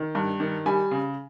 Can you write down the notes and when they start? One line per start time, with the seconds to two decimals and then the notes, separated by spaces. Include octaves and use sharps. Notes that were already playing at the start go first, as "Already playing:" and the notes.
Already playing: D#3
0.15 G2
0.40 D#3
0.66 G3 G#5 B5
0.91 C#3